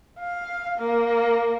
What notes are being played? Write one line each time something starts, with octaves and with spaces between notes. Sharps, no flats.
F5
A#3